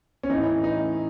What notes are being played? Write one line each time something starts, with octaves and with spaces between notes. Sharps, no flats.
C#4
A2 E3 D#4
D#4